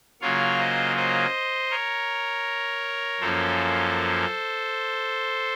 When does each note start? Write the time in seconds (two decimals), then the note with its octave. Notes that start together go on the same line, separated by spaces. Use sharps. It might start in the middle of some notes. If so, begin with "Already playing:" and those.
0.21 C#3 F#3 A#3 F4 C#5 F5
0.59 C5 D#5
0.96 C5 D#5
1.71 A#4 C#5
3.20 F#2 F3 A#3 C#4 A4 C5